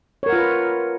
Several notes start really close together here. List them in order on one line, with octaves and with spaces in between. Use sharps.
C#5 A#4 F#5 F4 B4